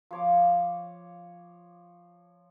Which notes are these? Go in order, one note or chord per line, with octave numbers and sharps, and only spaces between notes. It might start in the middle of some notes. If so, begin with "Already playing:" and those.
F3 C#5 D6